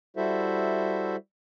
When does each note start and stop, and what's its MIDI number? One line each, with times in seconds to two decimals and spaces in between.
0.17 1.16 55
0.17 1.16 64
0.17 1.16 66
0.17 1.16 69
0.17 1.16 72
0.17 1.16 76